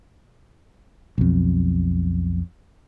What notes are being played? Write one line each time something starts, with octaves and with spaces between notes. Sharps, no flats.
B1 F2